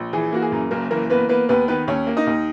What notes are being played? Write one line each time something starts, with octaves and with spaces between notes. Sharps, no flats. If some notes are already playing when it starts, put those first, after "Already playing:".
Already playing: A#1
E3 G#4
A#3 F#4
G#4
F#2
F#1 A#3 A#4
E3 A#3 A#4
A#3 B3 B4
A#3 B3 B4
D#2 B3 B4
D#3 B3 B4
D#2 C#4 C#5
A#3
D#4 D#5
D#2